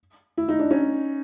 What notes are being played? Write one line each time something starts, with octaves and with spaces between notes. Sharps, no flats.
E4
D#4
D4
C#4 D#4